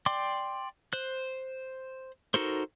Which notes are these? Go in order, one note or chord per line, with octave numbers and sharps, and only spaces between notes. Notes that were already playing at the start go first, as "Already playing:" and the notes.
D5 G5 C6 D6
C5 F#6
D#4 F#4 A4 A#4 C5